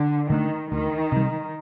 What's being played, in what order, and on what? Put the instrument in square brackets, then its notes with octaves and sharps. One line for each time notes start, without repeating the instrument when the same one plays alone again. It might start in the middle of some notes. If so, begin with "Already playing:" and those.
Already playing: [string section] D3
[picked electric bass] D3 A3 D4 [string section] D#3
[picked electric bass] D2 [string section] D#3
[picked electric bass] C3 G3